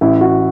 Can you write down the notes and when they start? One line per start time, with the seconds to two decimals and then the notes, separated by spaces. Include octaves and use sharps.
0.01 A1 E4
0.21 F#4